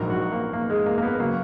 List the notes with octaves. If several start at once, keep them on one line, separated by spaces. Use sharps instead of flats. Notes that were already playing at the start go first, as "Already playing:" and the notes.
Already playing: A#1 G#2 D#3 F#3 A#4
F#4
A#3
A#3
G#3
A#3
A#3
B3
C#3 F#3 A#3